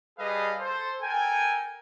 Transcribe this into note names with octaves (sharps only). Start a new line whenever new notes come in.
G3 G#4 A4 B4 D#5 F5
A4 C5
A4 A#4 G5 G#5